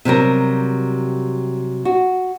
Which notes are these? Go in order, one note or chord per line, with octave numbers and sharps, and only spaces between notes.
C3 F#3 G3 A#4
F#4